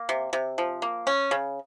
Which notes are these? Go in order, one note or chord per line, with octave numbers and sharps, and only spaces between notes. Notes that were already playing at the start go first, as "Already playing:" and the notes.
Already playing: A#3
C3
C3
F3
A#3
C#4
C#3